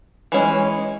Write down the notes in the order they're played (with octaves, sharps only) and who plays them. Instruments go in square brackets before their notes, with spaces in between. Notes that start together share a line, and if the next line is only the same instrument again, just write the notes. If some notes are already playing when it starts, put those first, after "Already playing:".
[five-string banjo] E3 G#3 C#4